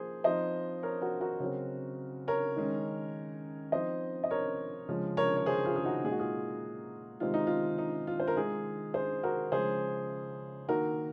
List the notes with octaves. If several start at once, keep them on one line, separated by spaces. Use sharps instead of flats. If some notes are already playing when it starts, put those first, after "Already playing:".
Already playing: F3 A#3 G#4 C5
F3 C4 D#4 C5 D#5
A#4 C#5
F#4 A#4
F#4 A#4
C#3 F#3 C4
A#4 C#5
D#3 G#3 C#4
F3 C4 D#4 C5 D#5
D#5
A#4 C#5
C#3 F3 G#3
A#4 C#5
C#5
G#4 C5
F4 G#4
G#4
D#4 F#4
A#2 G#3 D#4 G#4
F#4
F4 G#4
C3 D#3 G#3 C4 F4
D#4
F4
D#4
F4
C5
A#4
D#3 G#3 D#4 F4 G#4
G#4 C5
F#4 A#4
C#3 F3 G#3 G#4 C5
D#3 A#3 D#4 F#4 A#4